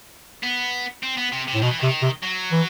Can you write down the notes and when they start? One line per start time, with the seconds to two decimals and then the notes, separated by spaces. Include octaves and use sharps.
0.43 B3
1.03 C4
1.17 B3
1.32 C3
1.48 C3
1.55 A2
1.62 B2 D#3
1.71 E3
1.80 C3 D#3
2.02 C3
2.23 F#3
2.52 E3